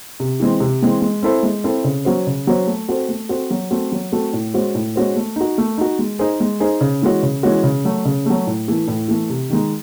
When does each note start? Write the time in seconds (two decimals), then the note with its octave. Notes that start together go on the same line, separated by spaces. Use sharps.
0.20 C3
0.40 E3 G#3 C4
0.60 C3
0.82 E3 G#3 C4
1.02 G#3
1.23 C4 E4 A4 C5
1.43 G#3
1.64 C4 E4 A4 C5
1.84 C#3
2.05 F#3 C#4 F#4 C5
2.27 C#3
2.47 F#3 C#4 F#4 C5
2.67 A3
2.89 C4 F#4 A4 C5
3.08 A3
3.29 C4 F#4 A4 C5
3.50 F#3
3.71 A3 C4 F#4 A4
3.92 F#3
4.12 A3 C4 F#4 A4
4.33 A2
4.54 G#3 C#4 F#4 C5
4.75 A2
4.95 G#3 C#4 F#4 C5
5.16 A3
5.36 D#4 F#4
5.58 A3
5.78 D#4 F#4
5.99 G#3
6.19 D#4 G#4 C5
6.40 G#3
6.60 D#4 G#4 C5
6.81 C#3
7.02 E3 G#3 C#4 F#4
7.23 C#3
7.43 E3 G#3 C#4 F#4
7.63 C#3
7.85 F#3 A3
8.05 C#3
8.26 F#3 A3
8.47 A2
8.68 E3 A3
8.88 A2
9.08 E3 A3
9.30 C3
9.50 D#3 G#3 D#4